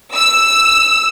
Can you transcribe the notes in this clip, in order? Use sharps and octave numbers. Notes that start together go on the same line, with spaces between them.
E6